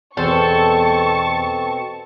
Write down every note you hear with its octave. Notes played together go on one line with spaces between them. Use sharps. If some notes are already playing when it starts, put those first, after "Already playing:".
E2 B2 C4 A4 C5 A5 C#6